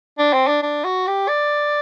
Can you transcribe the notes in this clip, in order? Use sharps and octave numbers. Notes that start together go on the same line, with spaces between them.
D4
C4
D4
D4
F#4
G4
D5